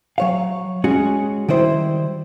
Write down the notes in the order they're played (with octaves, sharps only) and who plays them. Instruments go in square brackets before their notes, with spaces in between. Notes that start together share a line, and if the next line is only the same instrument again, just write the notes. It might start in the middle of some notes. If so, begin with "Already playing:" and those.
[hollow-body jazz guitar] F#3 C#5 F5
G#3 C#4 F#4 G#4
D#3 G3 E4 C5